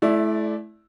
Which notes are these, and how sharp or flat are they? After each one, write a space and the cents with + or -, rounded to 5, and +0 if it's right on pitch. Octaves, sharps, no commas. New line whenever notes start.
A3 -35 E4 +0 D5 +0